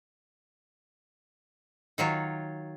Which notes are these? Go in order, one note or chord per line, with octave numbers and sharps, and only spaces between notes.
D#3 F#3 F4 C#5